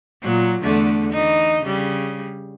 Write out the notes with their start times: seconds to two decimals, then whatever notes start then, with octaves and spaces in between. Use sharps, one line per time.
0.22 A#2 F#3
0.61 E2 D3 A3
1.12 E3 D#4
1.63 C#3 G3